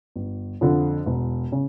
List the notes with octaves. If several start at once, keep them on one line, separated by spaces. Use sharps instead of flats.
G1
F2 D3 F3
E1
C#3